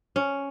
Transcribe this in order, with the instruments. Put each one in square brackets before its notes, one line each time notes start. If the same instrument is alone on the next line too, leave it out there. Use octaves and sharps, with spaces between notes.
[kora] C#4